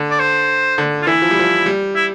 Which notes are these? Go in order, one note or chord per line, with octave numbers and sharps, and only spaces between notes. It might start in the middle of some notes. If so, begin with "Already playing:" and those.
Already playing: D3
D5
C5
D3
F4
E3 E4
F3
G3
F3
G3
E4